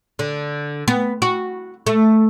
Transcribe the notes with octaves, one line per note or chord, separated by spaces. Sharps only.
D3
B3
F#4
A3